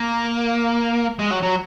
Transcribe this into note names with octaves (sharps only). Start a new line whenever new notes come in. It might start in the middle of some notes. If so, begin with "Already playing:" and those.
Already playing: A#3
G#3
F#3
F#3